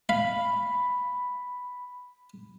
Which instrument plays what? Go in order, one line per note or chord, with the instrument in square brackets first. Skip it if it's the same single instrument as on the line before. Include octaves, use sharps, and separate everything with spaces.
[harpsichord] F5 [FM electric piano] B5